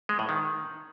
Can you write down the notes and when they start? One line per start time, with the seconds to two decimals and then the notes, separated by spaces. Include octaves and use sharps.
0.09 G#3
0.19 A2
0.29 D#3